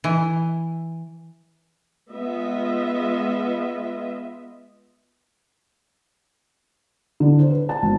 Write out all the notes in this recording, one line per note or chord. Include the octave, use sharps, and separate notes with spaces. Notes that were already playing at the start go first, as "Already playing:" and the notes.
E3
G#3 B3 F4 D#5 E5
D3
C5
B4
A5
G#1